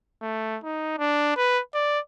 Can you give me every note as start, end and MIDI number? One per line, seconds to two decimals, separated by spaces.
0.22 0.58 57
0.64 0.96 63
0.98 1.32 62
1.37 1.60 71
1.74 1.99 74